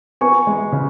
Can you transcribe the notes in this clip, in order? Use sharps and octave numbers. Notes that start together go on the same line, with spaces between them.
B3 G#5 C#6
G#3
C#3